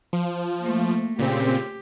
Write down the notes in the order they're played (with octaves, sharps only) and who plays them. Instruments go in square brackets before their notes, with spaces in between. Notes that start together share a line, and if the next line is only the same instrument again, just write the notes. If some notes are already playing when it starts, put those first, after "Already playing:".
[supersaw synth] F3
[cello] A3 A#3
[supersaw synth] A#2 C#3 C4 [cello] G4